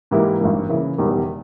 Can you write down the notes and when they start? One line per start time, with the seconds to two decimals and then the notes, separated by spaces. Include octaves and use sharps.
0.11 G#2 E3 A#3 E4 G4
0.40 G#1 G2 E3 A#3
0.69 C#3 E3 A#3 E4
0.98 E1 E2 D#3 G3